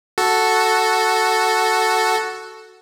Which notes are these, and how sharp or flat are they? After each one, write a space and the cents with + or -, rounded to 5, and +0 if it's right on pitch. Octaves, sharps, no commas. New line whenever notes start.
F#4 +0 A4 +0